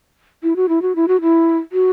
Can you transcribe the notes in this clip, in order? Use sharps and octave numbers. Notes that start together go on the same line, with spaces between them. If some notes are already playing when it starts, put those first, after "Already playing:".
E4
F#4
E4
F#4
E4
F#4
E4
F#4